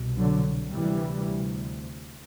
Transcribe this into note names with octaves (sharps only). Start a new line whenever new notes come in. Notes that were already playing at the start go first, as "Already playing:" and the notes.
Already playing: C2 B2
D3 F#3
D2 C3 E3 G3